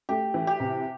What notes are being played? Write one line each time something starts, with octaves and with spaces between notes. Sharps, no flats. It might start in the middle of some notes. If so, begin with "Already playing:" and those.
A3 G4
E3
G4
C3